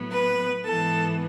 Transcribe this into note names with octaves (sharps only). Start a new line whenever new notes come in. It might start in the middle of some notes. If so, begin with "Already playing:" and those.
Already playing: A2 F#3 B3
B4
G#2 E3 B3 A4